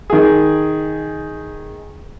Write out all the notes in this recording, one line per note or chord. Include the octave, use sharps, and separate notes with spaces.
D#3 G#4